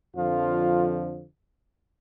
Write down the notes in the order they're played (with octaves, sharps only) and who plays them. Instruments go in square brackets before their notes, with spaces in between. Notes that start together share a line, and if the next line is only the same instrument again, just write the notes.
[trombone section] F2 D3 F3 F4